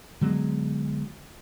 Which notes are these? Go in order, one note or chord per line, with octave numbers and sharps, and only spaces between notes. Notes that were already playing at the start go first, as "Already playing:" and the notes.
D3 F#3 G#3 B3